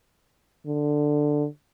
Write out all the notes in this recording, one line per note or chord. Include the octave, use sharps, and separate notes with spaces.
D3